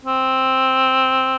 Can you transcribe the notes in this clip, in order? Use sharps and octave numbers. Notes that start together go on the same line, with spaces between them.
C4